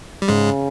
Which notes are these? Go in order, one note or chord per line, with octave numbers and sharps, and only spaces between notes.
G3
G#2 C#3 G#3